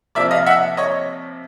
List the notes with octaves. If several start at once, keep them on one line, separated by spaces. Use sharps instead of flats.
C3 F3 A#3 D5 E5
D#5 F5
E5 F#5
C#5 D#5